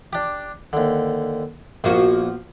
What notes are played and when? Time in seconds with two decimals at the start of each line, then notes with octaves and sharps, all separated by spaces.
0.13 D4 G4
0.73 D#2 D3
1.84 A#1 F3 A#3 B3 F#4 C#6